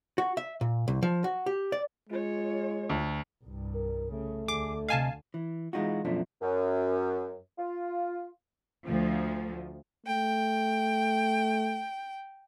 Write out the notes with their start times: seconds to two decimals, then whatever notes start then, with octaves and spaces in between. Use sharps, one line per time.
0.18 F#4
0.37 E5
0.61 A#2
0.88 C2
1.03 F3
1.24 F#4
1.46 G4
1.72 D5
2.09 G#3 F4 C#5
2.89 D2
3.44 C2 G2
3.74 A#4
4.12 C#3 A3
4.48 D2 D3 G#4 D6
4.89 C3 D#5 F5 G#5 A5
5.34 E3
5.73 E3 G#3 D#4 F4 F#4
6.05 F#2 B2 F3 A3 D4
6.41 F#2
7.58 F4
8.85 D2 F3
10.06 A3 G5